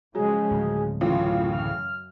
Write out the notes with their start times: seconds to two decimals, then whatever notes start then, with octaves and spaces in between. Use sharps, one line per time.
0.15 C#3 F3 F#3 G#3 G#4
0.51 D1
1.01 F#2 A2 C#3 E3 F4
1.53 F6